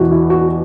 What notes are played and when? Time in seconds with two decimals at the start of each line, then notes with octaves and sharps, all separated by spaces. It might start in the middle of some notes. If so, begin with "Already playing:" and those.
Already playing: E2 B2 E4 F#4
0.11 E4
0.30 F#4
0.49 F#4